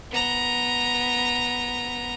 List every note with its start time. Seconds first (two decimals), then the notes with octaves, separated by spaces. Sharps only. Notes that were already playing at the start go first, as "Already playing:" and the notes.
0.11 B3 A#5